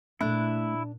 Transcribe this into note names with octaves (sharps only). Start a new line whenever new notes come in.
A#2 A3 D4 E4 F#6